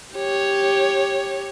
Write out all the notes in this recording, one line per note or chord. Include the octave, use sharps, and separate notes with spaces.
G4 C#5